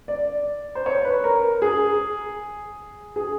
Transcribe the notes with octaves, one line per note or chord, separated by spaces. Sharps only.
D5
C5
C#5
B4
A#4
G#4
G#4